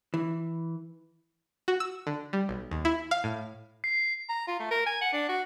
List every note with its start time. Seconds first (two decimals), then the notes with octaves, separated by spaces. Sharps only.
0.14 E3
1.68 F#4
1.80 E6
2.07 D3
2.33 G3
2.49 B1
2.71 D#2
2.85 E4
3.11 F5
3.24 A2
3.84 C7
4.29 A#5
4.48 F4
4.59 A3
4.71 A#4
4.86 G#5
5.01 F#5
5.13 D4
5.29 F#4